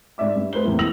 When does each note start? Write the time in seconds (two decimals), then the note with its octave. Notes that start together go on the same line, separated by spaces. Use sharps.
0.18 G#2 D5 E5 D6
0.36 G2
0.53 A3 B4 C5 G7
0.64 E2 A2 C3 A#3 E4
0.79 E6 A#6 F7 F#7